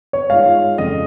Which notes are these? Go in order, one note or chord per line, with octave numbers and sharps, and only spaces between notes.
C#5
G#2 G#3 F4 F5
F2 C#3 G#3 D#5